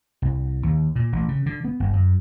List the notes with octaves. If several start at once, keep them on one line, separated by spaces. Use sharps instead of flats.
C2
D#2
A#2
A1
C#3
D3
B3
G1
F#2